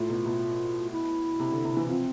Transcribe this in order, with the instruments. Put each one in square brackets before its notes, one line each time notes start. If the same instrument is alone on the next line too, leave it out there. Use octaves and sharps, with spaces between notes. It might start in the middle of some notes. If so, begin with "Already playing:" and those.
Already playing: [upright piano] A2 [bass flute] F4
[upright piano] B2
B2
[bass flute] E4
[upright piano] C3
D3
C3
E3
[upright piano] F3 [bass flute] C4